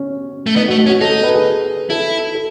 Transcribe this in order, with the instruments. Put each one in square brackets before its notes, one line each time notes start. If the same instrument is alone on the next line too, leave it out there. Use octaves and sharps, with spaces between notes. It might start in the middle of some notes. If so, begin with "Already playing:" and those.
Already playing: [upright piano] C#4
[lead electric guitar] A3
[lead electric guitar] B3 [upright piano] D#4
[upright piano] F#4
[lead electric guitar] A3
[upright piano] F#4
[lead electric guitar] C#4
[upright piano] F#4
[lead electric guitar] D#4 [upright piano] A4
[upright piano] B4
G#4
[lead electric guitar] E4 [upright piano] A4
[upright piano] A4